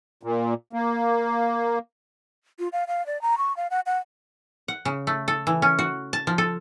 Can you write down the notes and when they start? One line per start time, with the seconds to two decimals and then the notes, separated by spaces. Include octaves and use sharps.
0.23 A#2
0.73 A#3
2.59 F4
2.73 F5
2.88 F5
3.06 D5
3.22 A#5
3.38 C#6
3.57 F5
3.71 F#5
3.86 F#5
4.68 F#5
4.85 C#3
5.07 A3
5.28 A4
5.47 E3
5.62 C#4
5.79 F#4
6.13 A5
6.27 F3
6.38 A4